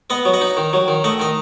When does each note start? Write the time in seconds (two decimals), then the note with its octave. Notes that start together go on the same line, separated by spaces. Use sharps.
0.10 B3 D#5 F#5
0.25 F#3
0.34 D#5 F#5
0.41 D#4
0.57 D#3
0.73 F#3
0.88 D#3
1.04 A3 D#5 F#5
1.20 D#3 D#5